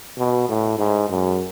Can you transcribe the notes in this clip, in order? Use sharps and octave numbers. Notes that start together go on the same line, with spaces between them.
B2
A2
G#2
F#2